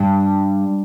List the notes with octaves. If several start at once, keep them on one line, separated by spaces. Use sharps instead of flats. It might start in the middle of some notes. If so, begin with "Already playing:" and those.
Already playing: G2